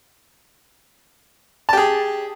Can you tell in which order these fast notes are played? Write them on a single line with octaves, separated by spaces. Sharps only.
A5 G4 G#4